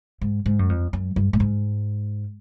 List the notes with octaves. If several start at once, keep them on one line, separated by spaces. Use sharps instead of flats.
G#2
G#2
F#2
F2
F#2
G2
A2
G#2